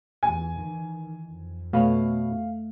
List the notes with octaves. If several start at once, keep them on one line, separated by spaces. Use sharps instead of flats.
E2 G#5
D#3 E3
F2
B2 A3 B4 C#5 F5